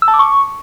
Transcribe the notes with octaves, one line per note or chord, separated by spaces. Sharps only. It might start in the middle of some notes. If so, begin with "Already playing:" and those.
E6
A5
D6
C#6